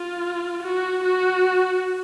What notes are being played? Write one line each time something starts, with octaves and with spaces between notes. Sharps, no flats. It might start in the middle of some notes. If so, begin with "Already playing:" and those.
Already playing: F4
F#4
F#4